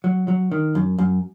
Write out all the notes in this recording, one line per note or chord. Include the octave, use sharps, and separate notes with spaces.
F#3
F#3
D#3
F#2
F#2